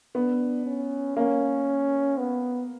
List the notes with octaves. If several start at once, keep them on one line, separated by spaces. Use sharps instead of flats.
B3 D4
C#4
A#3 C#4
B3